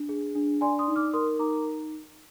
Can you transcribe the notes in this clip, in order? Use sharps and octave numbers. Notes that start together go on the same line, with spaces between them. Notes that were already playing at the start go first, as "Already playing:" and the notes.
Already playing: D4
G#4
D4
D5 G#5 C6
C6 D#6
D#4
D6 F6
A#4 C6 D#6
D#4 A#5 D6